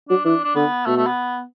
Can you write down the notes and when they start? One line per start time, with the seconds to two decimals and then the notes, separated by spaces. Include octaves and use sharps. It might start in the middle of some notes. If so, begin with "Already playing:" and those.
0.09 F#3 D4
0.24 E3 D4
0.44 D4
0.55 D3 B3
0.86 B2 A3
0.96 A3
1.07 B3